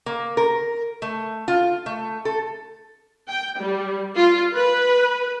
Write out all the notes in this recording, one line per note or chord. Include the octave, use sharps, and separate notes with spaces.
A#3
A#4
A3
F4
A3
A4
G5
G3
F4
B4